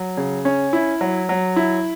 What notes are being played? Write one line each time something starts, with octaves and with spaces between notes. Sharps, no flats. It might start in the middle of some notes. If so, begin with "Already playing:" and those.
Already playing: F#3
C#3
C#4
E4
F#3
F#3
E4